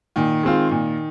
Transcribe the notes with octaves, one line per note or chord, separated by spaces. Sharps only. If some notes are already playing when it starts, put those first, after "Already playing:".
A#2 D#3
G#3 C4 F4
A#2